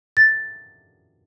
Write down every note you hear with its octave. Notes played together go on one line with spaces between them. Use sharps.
A6